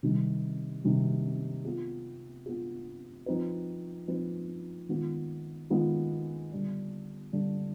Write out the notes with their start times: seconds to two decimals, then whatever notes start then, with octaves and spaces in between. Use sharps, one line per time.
0.03 C3 D#3 G3
0.83 C3 D#3 G3
1.65 B3 F4 G#4
2.46 B3 F4 G#4
3.26 F3 C4 D#4 B4
4.08 F3 C4 D#4 B4
4.89 D#3 G#3 B3 F4
5.70 D#3 G#3 B3 F4
6.52 D3 G3 D4
7.33 D3 G3 D4